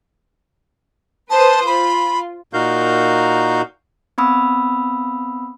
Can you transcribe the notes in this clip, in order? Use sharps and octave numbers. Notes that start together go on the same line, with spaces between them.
B4 C5 A5 D#6
F4 B5
A#2 D#4 F#4 A#4 F5 G6
B3 C4 B5 D#6 E6